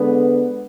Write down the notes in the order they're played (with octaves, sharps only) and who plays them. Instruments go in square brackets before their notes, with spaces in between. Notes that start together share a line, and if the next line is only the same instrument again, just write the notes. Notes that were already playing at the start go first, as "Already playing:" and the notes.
Already playing: [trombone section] D3 G#3 B3